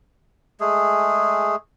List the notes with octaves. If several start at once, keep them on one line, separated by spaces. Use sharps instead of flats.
G#3 A3 G#4